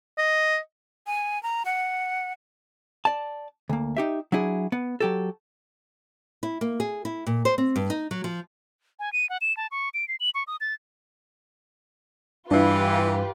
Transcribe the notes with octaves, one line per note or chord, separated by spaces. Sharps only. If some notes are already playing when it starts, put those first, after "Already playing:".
D#5
G#5
A#5
F#5
D5 A5
D2 A#3
D#4 G4 E5
F#3 D4 E4 G#4
B3
F#3 G4 A4
E4
A#3
G#4
E4
A#2
C5
C4
G2
D#4
F#3
F3
G#5
D#7
F#5
E7
A5
C#6
D7
C7
F#7
C#6
D#6
A6
G2 E3 D4 E4 F4 G4 B4